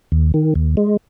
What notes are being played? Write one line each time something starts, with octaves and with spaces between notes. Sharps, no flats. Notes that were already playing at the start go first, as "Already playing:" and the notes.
D#2
D#3
D#2
G#3